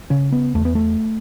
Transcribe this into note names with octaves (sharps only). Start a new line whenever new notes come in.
C#3 C#4
B3
E2 A3
B3
A3